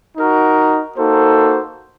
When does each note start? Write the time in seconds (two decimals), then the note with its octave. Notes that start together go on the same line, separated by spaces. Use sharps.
0.16 D#4 F#4 A#4
0.97 A#3 D#4 F#4 A4 C5